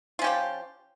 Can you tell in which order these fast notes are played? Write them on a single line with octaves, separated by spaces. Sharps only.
F4 C#4 G4 F3